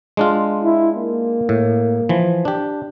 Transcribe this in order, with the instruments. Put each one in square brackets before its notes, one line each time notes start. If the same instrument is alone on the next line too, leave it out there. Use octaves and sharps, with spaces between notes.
[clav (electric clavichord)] G#3 D4 F4
[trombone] E4
A#3
[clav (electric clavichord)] A2
E3 F3
D4 G4